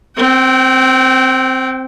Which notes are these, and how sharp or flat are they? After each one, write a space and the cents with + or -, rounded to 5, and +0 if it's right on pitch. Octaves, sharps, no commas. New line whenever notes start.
C4 +0 G5 -35